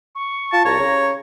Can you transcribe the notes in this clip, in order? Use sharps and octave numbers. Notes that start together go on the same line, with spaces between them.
C#6
F4 A5
C2 C#5 A#5
C#3